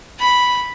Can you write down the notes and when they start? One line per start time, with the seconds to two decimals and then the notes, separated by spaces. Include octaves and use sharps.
0.19 B5